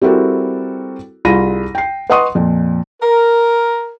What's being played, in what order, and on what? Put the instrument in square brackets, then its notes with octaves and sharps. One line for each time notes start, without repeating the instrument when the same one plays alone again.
[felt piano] G3 C4 E4 F#4 A4 A#4
C2 F4 G#4 B5 A#6 D#7
G5 C7
B4 D#5 F#5 C6 C#6 D#6
F2 A#2
[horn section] A#4